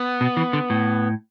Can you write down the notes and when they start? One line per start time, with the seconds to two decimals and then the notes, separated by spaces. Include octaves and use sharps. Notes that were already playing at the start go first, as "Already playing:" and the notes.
Already playing: B3
0.21 B2
0.37 E3
0.53 D3
0.70 A2